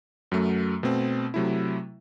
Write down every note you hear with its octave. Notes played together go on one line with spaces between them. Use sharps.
F#2 F#3 A3
B2 A3 C4
C3 F#3 A3 E4